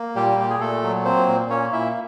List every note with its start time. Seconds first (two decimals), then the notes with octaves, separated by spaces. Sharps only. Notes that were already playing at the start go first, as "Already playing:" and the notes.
Already playing: A#3
0.16 A#2 G3 G4
0.38 A#2 G4
0.50 G#4
0.60 A#2 A3 A4
0.83 F#3
1.05 A#3 C4 C5
1.27 A#2
1.50 A#3 C#4 C#5
1.72 A#2 E4 E5